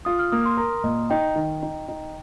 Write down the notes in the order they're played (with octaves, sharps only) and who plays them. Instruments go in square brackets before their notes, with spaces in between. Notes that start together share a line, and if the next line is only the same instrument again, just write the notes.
[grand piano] F4 [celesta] D#6
[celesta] F6
[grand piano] A#3 [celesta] D#6
[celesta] C6
[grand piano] A#4 [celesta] A#5
[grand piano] A#2 [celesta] D#5
[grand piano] D#4 [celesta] G5
[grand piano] D#3
D#4
D#4